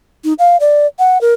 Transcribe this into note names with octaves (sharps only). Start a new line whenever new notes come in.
D#4
F5
D5
F#5
A#4